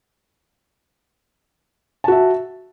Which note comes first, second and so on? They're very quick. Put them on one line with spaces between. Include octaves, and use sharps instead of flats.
A5 F#4 E5